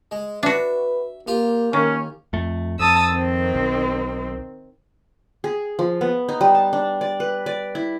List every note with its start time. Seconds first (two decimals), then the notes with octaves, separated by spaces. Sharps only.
0.11 G#3
0.43 D4 F#4 B4 E5
1.27 A#3 F4 G4
1.73 D#3 A#3 C#4
2.33 F2 A3
2.79 F2 A5 D#6 E6
3.12 D#3 C4
3.55 B1
5.44 G#4
5.79 F3
6.01 B3
6.29 D#4
6.41 G3
6.55 A5
6.73 D4
7.01 D5
7.20 B4
7.46 D5
7.75 E4